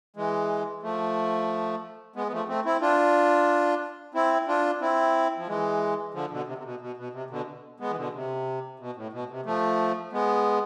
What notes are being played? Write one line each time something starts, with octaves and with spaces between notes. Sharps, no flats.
E3 G#3
F3 A3
G#3 B3
B3
F3 A3
A3 C4
C4 E4
D4 F4
C4 E4
D4 F4
C4 E4
F3
E3 G#3
D3 F3
B2 D3
C3
C3
B2
B2
B2
C3
B2 D3
G#3 B3
E3
B2 D3
C3
B2
A2
B2
C3
F3 A3
G#3 B3